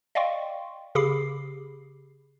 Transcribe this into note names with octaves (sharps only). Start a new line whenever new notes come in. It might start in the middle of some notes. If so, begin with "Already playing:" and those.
D5 D#5 F5 G5 C6 C#6
C#3 G4 G#4 B5 D6 C7